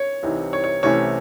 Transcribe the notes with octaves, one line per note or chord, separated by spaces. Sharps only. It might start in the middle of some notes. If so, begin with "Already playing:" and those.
Already playing: C#5
C2 C3 E3 C4 D#4
C#5
C#5
C2 C3 E3 A3 C#4 C#5